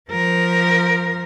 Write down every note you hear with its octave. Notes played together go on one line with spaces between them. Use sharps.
F3 A#4